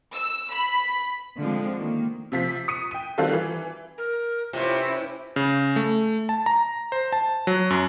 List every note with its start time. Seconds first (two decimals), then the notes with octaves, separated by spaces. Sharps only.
0.11 E6
0.50 B5
1.38 D3 F3 G#3 C4
1.78 D#3 A#3
2.32 C3 F3 B6
2.68 D#6 C#7 D#7
2.91 G5 D#7
3.18 D#3 G3 C4 F4 F#4 A4
3.33 E3
3.98 A#4
4.53 C3 C#4 E4 F4 B4
5.36 C#3
5.76 A3
6.29 A5
6.46 A#5
6.92 C5
7.13 A5
7.47 F#3
7.70 F#2